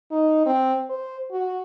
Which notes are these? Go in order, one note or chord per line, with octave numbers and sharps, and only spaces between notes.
D#4
C4
C5
F#4